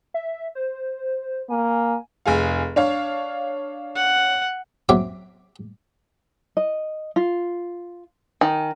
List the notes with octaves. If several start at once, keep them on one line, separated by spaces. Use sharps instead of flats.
E5
C5
A#3 G#5
F1 G#4 F5
D4 C#5 F5
F#5
F#3 C4 E5 D6
D#5
F4
D#3 G#5